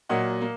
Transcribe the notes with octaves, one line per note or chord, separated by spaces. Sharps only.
A#2 F#3 A#3 D#5 F#5
A#3